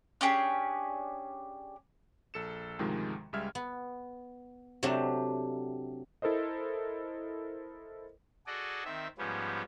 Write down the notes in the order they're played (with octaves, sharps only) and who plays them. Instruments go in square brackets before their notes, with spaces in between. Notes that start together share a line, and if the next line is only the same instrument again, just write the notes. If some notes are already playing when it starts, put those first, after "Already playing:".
[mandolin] C#4 D4 G4 G#4
[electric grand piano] A#1 A4 C#7 E7
D2 G#2 C3 D#3 F3 G#3
C#2 G3 G#3 E5 F6 G#6
[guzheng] B3
C3 F#3 A3 D4 G4
[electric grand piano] E4 A4 A#4 C5 D#5
[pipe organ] F#4 G#4 A4 D5 D#5
D#3 C4 E5
G#2 F3 G3 B3 C#4